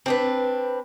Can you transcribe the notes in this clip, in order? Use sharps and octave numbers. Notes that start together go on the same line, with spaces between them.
C4 D4 B4